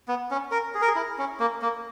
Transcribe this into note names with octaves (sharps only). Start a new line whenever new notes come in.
B3
C#4
A#4
G#4
A#4
G#4
E4
C#4
A#3
A#3